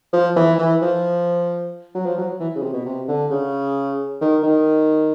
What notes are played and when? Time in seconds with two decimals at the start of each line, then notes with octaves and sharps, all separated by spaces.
0.13 F3
0.36 E3
0.58 E3
0.82 F3
1.95 F#3
2.06 F3
2.18 F#3
2.40 E3
2.55 C#3
2.63 C3
2.74 B2
2.86 C3
3.08 D3
3.30 C#3
4.21 D#3
4.43 D#3